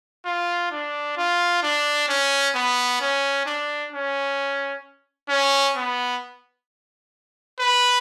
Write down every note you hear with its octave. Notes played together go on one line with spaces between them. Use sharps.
F4
D4
F4
D4
C#4
B3
C#4
D4
C#4
C#4
B3
B4